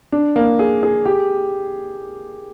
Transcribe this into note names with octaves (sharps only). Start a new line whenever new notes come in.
D4
A#3
G#4
G#4
G4